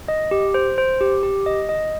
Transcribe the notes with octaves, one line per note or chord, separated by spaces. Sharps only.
D#5
G4
C5
C5
G4
G4
D#5
D#5